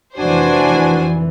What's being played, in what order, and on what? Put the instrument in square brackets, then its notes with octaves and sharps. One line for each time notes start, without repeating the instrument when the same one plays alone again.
[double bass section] F1 E3 [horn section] D4 [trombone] F#4 [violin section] C5 D5 G#5